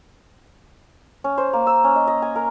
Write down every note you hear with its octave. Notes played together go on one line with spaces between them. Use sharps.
C#4
C5
A#3
E6
C#4
D#5
D#5
G#5
A#4